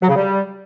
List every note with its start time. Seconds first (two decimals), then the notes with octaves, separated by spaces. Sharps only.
0.01 F#3
0.09 C#3
0.16 G3